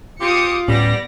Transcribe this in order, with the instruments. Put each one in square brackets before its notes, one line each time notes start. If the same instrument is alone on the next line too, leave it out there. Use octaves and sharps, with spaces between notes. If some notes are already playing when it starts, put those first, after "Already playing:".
[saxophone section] C4 G4 [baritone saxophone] F4 [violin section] D#6 C#7
[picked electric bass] D1 A2 C#4 [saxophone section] G3 [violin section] B3 D5 A#6